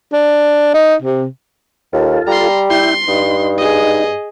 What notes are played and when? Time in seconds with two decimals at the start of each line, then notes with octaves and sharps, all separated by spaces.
0.13 D4
0.74 D#4
1.02 C3
1.93 D#2 F4 A4
2.27 G3 A#5 C6
2.70 E4 G5 C6
3.08 G2 D#4
3.58 G#4 D#5